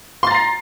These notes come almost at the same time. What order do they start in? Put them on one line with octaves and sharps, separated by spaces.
C6 A6 A#5 C7